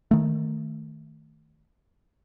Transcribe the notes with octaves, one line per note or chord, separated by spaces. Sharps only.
D#3 A3